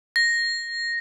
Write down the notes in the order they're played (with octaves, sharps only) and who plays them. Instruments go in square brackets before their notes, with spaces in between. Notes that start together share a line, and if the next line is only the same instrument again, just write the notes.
[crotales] A#6